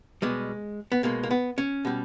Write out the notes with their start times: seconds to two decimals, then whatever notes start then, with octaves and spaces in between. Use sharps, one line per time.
0.22 B2 G3 G#3
0.92 B3
1.03 B2 G#3 A#3
1.23 A#3
1.31 B3
1.58 C#4
1.85 B2 G3